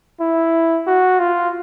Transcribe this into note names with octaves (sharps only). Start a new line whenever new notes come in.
E4
F#4
F4